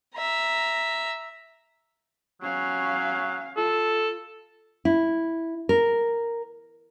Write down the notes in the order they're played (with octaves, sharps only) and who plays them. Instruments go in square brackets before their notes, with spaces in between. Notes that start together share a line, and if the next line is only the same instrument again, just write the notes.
[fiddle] E5 A#5
[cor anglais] F#3 [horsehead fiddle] C#4 F5
[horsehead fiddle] F4 [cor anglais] A4
[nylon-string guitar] E4
A#4